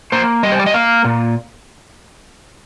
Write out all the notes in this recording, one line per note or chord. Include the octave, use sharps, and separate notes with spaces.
A#3 C5
G3 D#5
C5
D5
D#5
A#3 F5
A#2